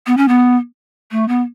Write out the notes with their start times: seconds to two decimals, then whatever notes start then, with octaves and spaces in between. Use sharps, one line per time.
0.07 B3
0.17 C#4
0.28 B3
1.12 A3
1.28 B3